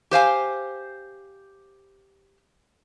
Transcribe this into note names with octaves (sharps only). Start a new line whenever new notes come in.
G4 C5 F5 G#5